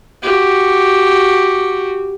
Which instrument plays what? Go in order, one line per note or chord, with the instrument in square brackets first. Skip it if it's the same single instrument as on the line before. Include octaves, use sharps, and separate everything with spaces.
[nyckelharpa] F#4 G4